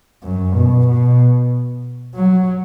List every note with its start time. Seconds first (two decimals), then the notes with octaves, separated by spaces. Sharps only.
0.23 F#2
0.55 B2
0.87 B2
2.15 F#3